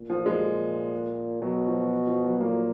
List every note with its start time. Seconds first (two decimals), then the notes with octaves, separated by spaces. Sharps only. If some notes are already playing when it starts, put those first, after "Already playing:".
Already playing: A#2
0.10 F3
0.26 G#3
1.41 B2 F#3
1.67 F3
2.07 F3
2.24 F#3
2.40 A#2 A#3